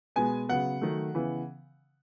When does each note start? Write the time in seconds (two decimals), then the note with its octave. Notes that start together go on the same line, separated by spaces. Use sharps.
0.16 B2 G#3 B3 G#5
0.49 C#3 F#3 B3 F#5
0.81 D#3 F#3 A3
1.14 C#3 E3 B3